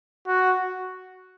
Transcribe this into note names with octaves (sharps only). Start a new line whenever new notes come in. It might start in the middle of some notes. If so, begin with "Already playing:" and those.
F#4